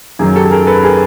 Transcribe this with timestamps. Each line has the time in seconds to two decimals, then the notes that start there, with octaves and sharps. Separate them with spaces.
0.19 F#2 D#3 F#3 G#4
0.36 G4 A4
0.51 G#4 A#4
0.67 A4 B4
0.84 G#4 A#4